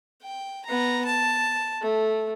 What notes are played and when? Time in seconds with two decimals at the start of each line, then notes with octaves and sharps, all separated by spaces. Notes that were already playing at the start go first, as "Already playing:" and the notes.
0.23 G5
0.66 B3 A#5
1.05 A5
1.82 A3